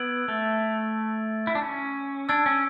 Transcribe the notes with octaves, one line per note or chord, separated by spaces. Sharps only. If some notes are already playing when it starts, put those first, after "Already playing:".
Already playing: B3 E6 G#6 D7 F#7
A3
E4
D4
C#4
D4 E6 G#6 D7
C#4